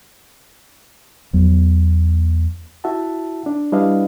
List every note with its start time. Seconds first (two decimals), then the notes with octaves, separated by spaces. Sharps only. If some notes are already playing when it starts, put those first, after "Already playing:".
1.33 E2 F#3 B3
2.84 E4 F#4 E5 F#5 A5
3.46 D4
3.72 G3 D4 E4 B4 D#5 F5